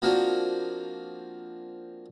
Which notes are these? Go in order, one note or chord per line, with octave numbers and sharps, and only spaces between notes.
F3 A#3 C4 D4 F#4